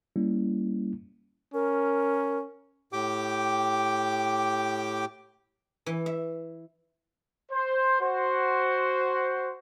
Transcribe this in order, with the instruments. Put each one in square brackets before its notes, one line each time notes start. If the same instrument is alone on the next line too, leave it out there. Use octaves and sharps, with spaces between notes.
[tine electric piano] G3 A#3 C#4 E4
[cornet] C#4 [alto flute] A#4
[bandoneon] A2 G4 G5 D6
[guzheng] E3
E5
[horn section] C5
F#4 C5